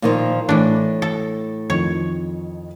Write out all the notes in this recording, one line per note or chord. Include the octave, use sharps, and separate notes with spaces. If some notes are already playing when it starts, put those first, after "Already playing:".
A#2 D#3 F3
A2 E3 D4
A4
F2 D#3 F3 C#5